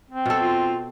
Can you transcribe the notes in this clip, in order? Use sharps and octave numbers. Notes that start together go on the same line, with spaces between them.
C4
B2 A4
F4